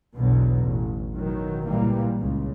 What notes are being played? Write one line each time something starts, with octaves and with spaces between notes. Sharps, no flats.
B1 E2 B2 D3 F#3
A1
B2 D#3 F#3
C#2 A#2 E3 G3 A#3
C#2 C#3